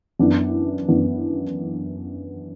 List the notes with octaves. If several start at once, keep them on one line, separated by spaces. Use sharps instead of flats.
F#2 E3 B3 D4
F#2 E3 B3 D4